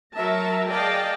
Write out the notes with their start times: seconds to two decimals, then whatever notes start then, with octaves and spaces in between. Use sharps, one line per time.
0.14 F#3 A#4 E5 A5 A#5
0.69 G#4 D5 D#5 F5 G5 A5